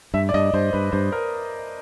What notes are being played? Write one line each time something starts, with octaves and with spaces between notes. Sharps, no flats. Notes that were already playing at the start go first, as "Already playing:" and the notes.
G2 E5
D5
G2 D#5
G2 C5
G2 B4
G2 C5
A#4